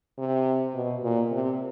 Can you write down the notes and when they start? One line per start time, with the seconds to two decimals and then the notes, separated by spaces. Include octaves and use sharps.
0.18 C3
0.74 B2
1.03 A#2
1.31 C3